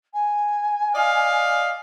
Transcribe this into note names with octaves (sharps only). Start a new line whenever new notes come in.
G#5
D5 D#5 F5